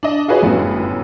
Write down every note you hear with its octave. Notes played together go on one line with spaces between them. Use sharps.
D4 D#5
F4 F#4 G#4 B4 C#5 D#5
G1 F#2 A2 B3